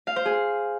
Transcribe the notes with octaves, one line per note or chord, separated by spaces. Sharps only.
F5
C5
G#4